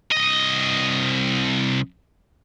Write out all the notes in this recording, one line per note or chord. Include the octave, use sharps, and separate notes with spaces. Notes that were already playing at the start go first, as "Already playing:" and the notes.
C2 D#5